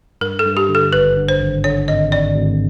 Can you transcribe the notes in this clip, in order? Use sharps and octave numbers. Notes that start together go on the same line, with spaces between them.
G2 A#4
A4
G2
G4
D3
A4
G#1 B4
D3
C5
G#1
D3 C#5
G#1 D#5
G#1 D5
G#1